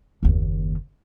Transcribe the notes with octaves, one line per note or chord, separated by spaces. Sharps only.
F#1 D#2